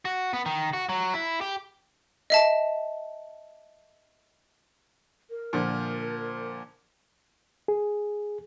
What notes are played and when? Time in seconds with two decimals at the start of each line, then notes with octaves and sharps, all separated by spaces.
0.05 F#4
0.33 B3
0.46 D#3
0.73 F#4
0.89 F#3
1.14 E4
1.41 G4
2.30 D#5 E5 A5
5.30 A#4
5.53 A#2 D3 F3
7.68 G#4